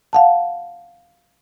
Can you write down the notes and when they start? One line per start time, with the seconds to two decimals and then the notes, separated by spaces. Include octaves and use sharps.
0.13 F5 F#5 A5